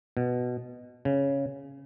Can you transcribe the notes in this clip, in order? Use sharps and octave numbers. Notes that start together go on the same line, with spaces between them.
B2
C#3